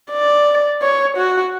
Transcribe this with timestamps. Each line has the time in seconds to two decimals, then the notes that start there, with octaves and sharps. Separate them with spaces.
0.11 D5
0.82 C#5
1.17 F#4